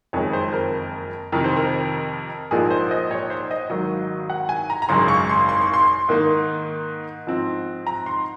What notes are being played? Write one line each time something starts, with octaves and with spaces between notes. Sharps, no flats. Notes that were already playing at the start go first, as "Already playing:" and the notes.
F#1 F2 D#3 G#3 C#5
C5
A#4
F2 C3 D#3 A#4
C5
A#4
A#1 G#2 F3 A#3 G#4
C5
D#5
C#5
C5
D#5
G#1 G#2 D#3 F#3
F#5
G#5
A#5
A#5
G#1 F#2 C#3 G#3 C6
C#6
C6
C6
C#6
C6
G#2 D#3 A#3 D#4
G#2 F3 C4
A#5
C6